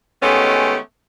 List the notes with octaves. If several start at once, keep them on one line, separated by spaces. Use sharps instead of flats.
D#3 G#3 A3 B3 C#4 G4